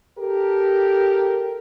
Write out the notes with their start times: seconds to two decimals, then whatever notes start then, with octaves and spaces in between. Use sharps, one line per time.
0.19 G4 A4 A#4